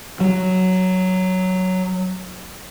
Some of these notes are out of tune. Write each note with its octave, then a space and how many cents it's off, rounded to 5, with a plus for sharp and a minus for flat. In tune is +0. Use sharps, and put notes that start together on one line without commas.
F#3 +5